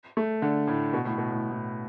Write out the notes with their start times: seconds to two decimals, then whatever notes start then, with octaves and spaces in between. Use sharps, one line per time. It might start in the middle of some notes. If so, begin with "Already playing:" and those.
0.17 A3
0.42 D3
0.67 A2
0.93 B2
1.05 A2
1.18 B2
1.31 A2
1.51 A2